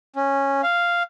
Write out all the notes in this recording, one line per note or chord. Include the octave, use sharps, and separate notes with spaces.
C#4
F5